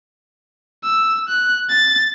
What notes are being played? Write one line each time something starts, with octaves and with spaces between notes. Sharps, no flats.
E6
F#6
A6